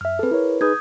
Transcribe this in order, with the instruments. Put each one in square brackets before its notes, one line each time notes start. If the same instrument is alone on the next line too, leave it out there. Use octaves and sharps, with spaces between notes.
[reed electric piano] F#2 E5 [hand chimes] F6
[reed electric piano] C4 A4 [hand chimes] G#4 B4
[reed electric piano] E4 A#4 C#5
[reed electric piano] D#4 G#4 B4 [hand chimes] D#6 G6 G#6